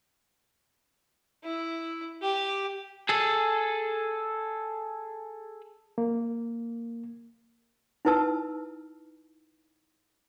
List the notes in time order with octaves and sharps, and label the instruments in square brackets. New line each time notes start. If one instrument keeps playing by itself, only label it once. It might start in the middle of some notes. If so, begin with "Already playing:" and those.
[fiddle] E4
G4
[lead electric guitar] G#4 A4
[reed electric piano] A#3
[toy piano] D#4 E4 B4 A5 E6